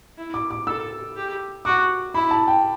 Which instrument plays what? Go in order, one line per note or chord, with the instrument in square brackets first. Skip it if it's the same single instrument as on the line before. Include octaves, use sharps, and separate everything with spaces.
[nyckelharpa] E4
[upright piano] D6
D6
[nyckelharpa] A4 [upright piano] E6
[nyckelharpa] G4
[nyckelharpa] F#4 [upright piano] D6
[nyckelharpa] E4 [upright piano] B5
[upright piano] A5
G5